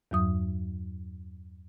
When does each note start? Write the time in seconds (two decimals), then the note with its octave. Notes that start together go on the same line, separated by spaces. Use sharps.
0.11 E2 G2 F#3 D#6